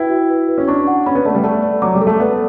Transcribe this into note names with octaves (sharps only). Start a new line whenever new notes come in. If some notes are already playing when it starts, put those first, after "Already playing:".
Already playing: E4 F#4 B4 G5
F#4
B4
B4
C#4
D4 C#6
F#5
C#4 B5
B3
A3 D5
G3
A3 D5
D5
F#3 D6
G3
A4
A3
B3 D5